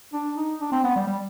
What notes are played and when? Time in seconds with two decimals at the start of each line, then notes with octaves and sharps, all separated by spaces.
0.13 D4
0.37 D#4
0.61 D4
0.72 C4
0.84 B3
0.96 G3
1.07 G3